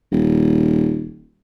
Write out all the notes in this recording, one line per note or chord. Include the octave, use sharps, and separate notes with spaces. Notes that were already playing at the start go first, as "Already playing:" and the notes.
D#1